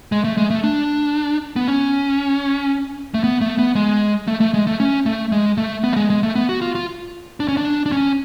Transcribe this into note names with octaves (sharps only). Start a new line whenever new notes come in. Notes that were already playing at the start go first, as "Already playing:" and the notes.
G#3
A3
G#3
A3
D4
B3
C#4
A3
B3
A3
B3
G#3
A3
A3
G#3
A3
C#4
A3
G#3
A3
B3
A3
G#3
G#3
A3
B3
F#4
F4
F4
D4
C#4
D4
D4
C#4